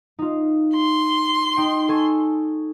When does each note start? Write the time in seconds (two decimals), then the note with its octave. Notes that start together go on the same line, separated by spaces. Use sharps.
0.19 D#4 F4
0.75 C6
1.57 D#4 G5
1.89 A4 G#5 C#6